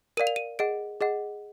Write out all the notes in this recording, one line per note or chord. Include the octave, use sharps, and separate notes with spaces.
A#4 D5 F5 D#7
F7
D#7
G#4 D#5 F#5 D7
G#4 D#5 F#5